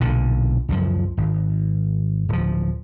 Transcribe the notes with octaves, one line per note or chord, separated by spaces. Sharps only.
B1 A#2 D3
C#2 F#2 F3
G#1
D1 F3